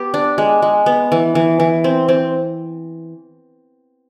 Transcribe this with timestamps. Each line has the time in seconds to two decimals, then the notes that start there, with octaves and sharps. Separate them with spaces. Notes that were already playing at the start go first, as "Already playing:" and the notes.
Already playing: B3 G4
0.14 D4
0.38 G#3
0.62 G#3
0.86 B3
1.12 E3
1.35 E3
1.60 E3
1.84 C4
2.08 C4